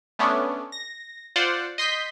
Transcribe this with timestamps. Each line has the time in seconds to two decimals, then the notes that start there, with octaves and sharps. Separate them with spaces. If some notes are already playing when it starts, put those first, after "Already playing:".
0.19 A3 B3 C#4 D4
0.72 A#6
1.36 F4 C5 D5 F#5
1.78 D#5 C6 G6 B6